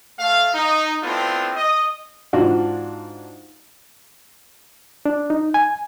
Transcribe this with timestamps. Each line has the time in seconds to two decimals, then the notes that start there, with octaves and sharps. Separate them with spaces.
0.19 A3 F5
0.54 D#4
1.03 A3 B3 C4 D4 E4 F4
1.56 D#5
2.33 G#2 D4 F4 F#4
5.06 D4
5.30 D#4
5.54 G#5